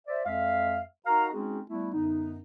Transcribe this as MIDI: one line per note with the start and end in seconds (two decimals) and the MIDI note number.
0.07 0.22 72
0.07 0.22 74
0.07 0.22 76
0.26 0.81 41
0.26 0.81 56
0.26 0.81 76
0.26 0.81 77
1.06 1.27 63
1.06 1.27 66
1.06 1.27 70
1.06 1.27 77
1.06 1.27 82
1.33 1.60 56
1.33 1.60 60
1.33 1.60 61
1.33 1.60 63
1.33 1.60 66
1.33 1.60 68
1.68 1.92 55
1.68 1.92 57
1.68 1.92 59
1.68 1.92 64
1.93 2.38 42
1.93 2.38 50
1.93 2.38 59
1.93 2.38 63